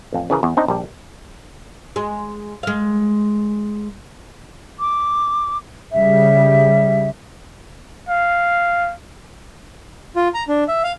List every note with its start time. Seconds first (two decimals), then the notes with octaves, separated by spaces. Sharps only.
0.13 A1 F2
0.30 C#3 E3 G#4 A#4
0.43 E2
0.57 C4 D4 D#4
0.68 A#1 G3
1.96 G#3
2.63 G#3 F5
4.80 D6
5.92 C#3 G3 E5
8.09 F5
10.16 F4
10.34 A#5
10.48 D4
10.68 E5
10.84 F5